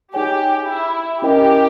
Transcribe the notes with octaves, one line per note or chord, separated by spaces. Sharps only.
D#4 G4 G#4 C#5 G#5
E4
C#4 E4 G4 A#4 D#5 G5